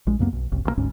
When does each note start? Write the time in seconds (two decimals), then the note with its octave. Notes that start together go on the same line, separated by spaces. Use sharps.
0.07 A#1 G#3
0.19 C#2 F#2 A#3 B3
0.33 B1
0.52 F#1 C2
0.65 B1 C#3 A#3
0.77 G1 D2 G#2 C#4